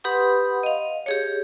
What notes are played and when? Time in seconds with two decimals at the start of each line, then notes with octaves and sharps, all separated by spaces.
0.04 G4 B4 F#5 B5 C6 D#6
0.63 D#5 F5
1.06 G4 G#4 C#5